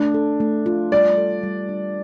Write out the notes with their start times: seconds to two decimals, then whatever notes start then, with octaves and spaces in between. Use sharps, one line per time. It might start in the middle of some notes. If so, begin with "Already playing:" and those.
Already playing: A3 D4
0.14 A4
0.40 A3
0.66 F4
0.92 G3 D5
1.17 A4
1.43 G3
1.69 D4